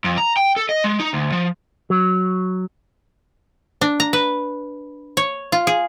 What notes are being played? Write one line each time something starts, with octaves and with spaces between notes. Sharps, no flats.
F2
A#5
G5
A4
D#5
G#3
D#4
D2
F3
F#3
D4
A#5
B4
C#5
F4
G#4